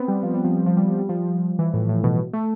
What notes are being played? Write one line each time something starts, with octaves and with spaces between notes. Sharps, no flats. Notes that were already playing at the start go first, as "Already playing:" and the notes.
Already playing: B3 C4
G3
F3
G3
F3
G3
F3
G3
F3
G3
F3
E3
A2
A2
B2
A3